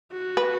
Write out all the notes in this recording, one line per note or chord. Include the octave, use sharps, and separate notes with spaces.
F#4
B4